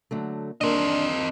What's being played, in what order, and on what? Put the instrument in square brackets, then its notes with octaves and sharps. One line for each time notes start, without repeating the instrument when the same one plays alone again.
[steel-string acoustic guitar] D3 F#3 A3
[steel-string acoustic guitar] D#2 A#4 [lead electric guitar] C4 D#5 [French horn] D4